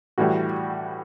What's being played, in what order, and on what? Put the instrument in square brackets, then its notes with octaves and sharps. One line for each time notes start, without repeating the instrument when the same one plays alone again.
[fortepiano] A2 E3 G3 F#4